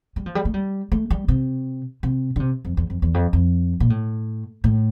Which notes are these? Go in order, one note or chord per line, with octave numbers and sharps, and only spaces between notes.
G3
F3
G3
A3
G3
A3
G3
C3
C3
D3
C3
F2
E2
F2
E2
F2
F2
A#2
A2
A2